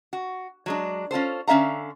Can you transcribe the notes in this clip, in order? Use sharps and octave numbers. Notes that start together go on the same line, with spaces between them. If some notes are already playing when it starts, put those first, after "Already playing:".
F#4
F#3 G#3 D4
C#4 F4 A4 C5
D3 C#4 E5 F5 A#5